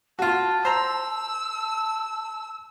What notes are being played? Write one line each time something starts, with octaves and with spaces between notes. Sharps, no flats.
F4 F#4 A5
C5 A#5 E6
A5